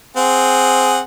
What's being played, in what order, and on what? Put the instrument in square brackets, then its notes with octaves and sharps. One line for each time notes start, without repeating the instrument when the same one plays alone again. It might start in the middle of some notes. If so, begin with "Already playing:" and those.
[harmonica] C4 G#4 F#5